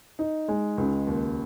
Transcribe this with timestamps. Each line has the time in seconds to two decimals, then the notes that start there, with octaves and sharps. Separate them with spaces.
0.19 D#4
0.48 G#3
0.78 C#2
1.07 D#2